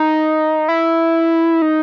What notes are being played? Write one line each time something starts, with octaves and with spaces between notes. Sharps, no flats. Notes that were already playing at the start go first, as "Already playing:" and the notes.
Already playing: D#4
E4
D#4